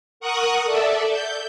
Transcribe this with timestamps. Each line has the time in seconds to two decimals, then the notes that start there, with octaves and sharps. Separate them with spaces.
0.20 A#4 F#5 C#6 D#6 F#6
0.64 A4 D5 E5
1.09 G6